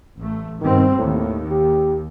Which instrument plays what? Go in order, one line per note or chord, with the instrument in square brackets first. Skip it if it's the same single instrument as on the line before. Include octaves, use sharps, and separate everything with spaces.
[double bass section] A1 A3
[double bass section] G2 B2 C4 [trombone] D#3
[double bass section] D#2 [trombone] A2
[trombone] G4